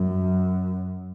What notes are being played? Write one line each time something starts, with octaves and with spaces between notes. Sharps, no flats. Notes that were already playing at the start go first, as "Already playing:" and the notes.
Already playing: F#2